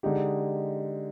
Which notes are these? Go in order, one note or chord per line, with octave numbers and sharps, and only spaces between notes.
D3 G#3 D#4 G4